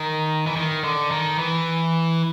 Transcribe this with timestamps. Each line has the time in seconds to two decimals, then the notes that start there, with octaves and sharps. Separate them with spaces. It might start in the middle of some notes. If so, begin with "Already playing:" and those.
Already playing: D#3
0.47 E3
0.57 D#3
0.84 D3
1.11 D#3
1.39 E3